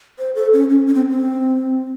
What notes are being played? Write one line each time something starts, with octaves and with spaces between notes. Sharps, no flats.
C5
A4
C#4
C#4
C#4
C4
C4